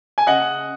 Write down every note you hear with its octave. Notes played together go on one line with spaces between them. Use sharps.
G#5
C#3 D#5 F#5